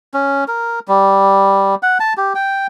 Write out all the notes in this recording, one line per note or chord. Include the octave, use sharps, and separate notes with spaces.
C#4
A#4
G3
F#5
A5
G4
G5